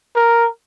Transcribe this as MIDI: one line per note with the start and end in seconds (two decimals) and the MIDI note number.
0.16 0.47 70